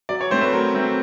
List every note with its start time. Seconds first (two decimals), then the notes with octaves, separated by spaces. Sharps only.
0.09 F#3 D5
0.21 C#5
0.31 A3 C4 C5
0.41 B4
0.53 F#3 A#4
0.74 A3 C4